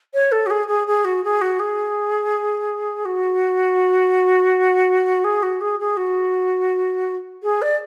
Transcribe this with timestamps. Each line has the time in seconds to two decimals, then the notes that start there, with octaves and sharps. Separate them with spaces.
0.14 C#5
0.32 A4
0.46 F#4
0.50 G#4
0.68 G#4
0.87 G#4
1.05 F#4
1.24 G#4
1.41 F#4
1.59 G#4
3.05 F#4
5.24 G#4
5.42 F#4
5.61 G#4
5.80 G#4
5.97 F#4
7.43 G#4
7.62 D5